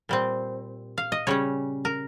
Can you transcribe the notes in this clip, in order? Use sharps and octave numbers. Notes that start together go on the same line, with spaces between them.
A#2 G3 C4
F5
D#5
C#3 G3 C#4 C#5
A#4